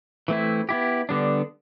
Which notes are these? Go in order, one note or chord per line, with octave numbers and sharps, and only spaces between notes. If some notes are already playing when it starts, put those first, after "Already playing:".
E3 A3 C4 E4
B3 E4 G4
D3 G3 B3 D4